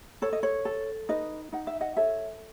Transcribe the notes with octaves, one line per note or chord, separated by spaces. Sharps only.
A4 C#5
D#5
C#5
A4
D#4 B4 D#5
D#4 F#5
E5
D#5 F#5
A4 C#5 E5